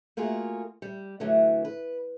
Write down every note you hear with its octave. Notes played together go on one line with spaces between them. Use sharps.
A3 A#3 F4 F#4 G#4
G3
D3 E3 F#3 A3 D4
B4